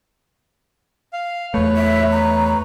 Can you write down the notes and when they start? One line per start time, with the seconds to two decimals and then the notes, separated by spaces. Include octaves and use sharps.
1.13 F5
1.54 E2 A3 B4 C#5
1.77 E5
2.12 A#5